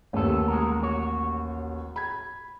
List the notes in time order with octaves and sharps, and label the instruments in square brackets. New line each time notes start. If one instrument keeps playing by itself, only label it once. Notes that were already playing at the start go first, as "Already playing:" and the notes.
[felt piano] A1 D#2 [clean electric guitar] B3 A4
[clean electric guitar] G#3 F#4 A#4
F#4 C#5
[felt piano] B5 G#6